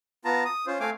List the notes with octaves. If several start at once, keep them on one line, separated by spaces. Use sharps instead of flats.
B3 F4 A5 A#5
D#6
C#4 F4 C5
A3 C4 F5 G#5 D6